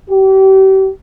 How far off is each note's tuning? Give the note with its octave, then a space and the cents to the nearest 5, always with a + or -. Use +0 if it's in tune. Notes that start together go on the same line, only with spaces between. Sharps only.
G4 -35